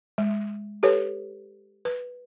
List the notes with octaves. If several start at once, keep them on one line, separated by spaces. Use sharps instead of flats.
G#3
G4 A4 B4 C#5
B4